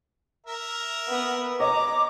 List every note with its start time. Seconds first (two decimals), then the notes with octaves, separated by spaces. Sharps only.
0.46 A#4 E5 A#5
1.08 B3
1.60 C#5 D#5 A#5 D6